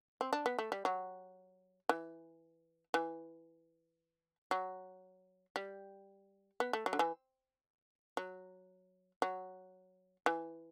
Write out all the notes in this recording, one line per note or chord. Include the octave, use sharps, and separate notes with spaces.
C4
D4
B3
A3
G3
F#3
E3
E3
F#3
G3
B3
A3
F#3
D3
E3
F#3
F#3
E3